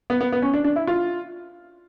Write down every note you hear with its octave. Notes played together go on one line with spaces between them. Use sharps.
B3
B3
B3
C#4
D4
D4
E4
F4